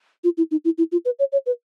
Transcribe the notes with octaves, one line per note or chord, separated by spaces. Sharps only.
F4
E4
D#4
E4
E4
F4
B4
C#5
C#5
B4